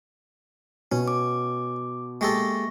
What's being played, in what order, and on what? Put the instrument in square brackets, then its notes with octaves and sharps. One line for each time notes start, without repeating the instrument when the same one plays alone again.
[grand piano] B2 [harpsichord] C#4
[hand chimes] D6
[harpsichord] G#3 G4 A4 [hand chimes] A#3 C#6 A#6